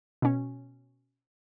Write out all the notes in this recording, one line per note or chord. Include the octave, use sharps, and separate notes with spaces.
B2 C#4